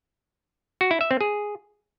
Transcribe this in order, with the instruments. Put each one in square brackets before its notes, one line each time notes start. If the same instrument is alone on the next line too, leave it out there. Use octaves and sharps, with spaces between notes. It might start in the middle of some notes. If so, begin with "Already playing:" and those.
[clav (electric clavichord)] F#4
E4
E5
C4
G#4